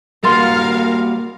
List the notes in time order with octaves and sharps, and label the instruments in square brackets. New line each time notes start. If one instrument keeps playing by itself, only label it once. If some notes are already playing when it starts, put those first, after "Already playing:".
[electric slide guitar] G3 A#3 F#4 [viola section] A#4 F5 [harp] C6 F6 A6